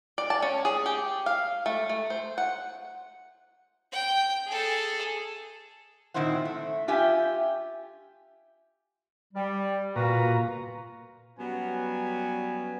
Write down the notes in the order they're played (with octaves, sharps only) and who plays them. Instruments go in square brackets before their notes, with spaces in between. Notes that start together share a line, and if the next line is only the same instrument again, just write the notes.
[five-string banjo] D5
A5
C#4
G#4
G4
F5
A3
A3
C5
F#5
[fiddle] G5
G#4 A4
[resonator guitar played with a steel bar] A#2 D#3 C4 E4 C5 F#5
A3
F4 G4 E5 G5 G#5
[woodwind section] G3
[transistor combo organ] A#2 A#5 [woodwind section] F4 F#4 B4
[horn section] F#3 G3 B3 C#4 B4 G#5